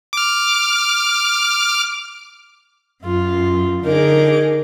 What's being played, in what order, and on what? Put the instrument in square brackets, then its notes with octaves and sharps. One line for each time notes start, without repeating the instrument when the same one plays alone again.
[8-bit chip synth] D6 F6
[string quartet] F#2 [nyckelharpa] F4
[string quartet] D3 G#4 D6 [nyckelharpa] D#4 A#4